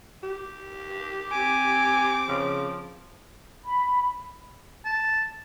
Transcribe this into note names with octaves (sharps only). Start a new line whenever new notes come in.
G4
C4 G#5 D6
C#3 F3
B5
A5